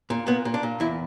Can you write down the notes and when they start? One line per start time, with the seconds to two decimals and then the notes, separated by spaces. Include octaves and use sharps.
0.10 A#2
0.27 A#2 B3
0.45 A#2
0.54 D4
0.63 A#2
0.80 E2 E4